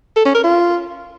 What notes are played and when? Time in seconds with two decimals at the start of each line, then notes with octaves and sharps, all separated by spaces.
0.16 A4
0.25 C#4
0.34 A#4
0.43 F4